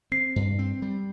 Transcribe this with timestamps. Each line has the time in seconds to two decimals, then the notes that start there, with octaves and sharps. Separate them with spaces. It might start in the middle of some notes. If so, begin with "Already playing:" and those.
0.12 C4 C7
0.36 G2
0.59 C4
0.82 G3